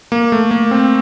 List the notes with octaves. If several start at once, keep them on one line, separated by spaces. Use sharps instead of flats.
A#3
A3
A#3
C4